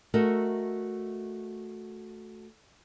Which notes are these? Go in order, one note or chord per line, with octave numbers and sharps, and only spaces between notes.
A3 F#4 A#4 D#5 E5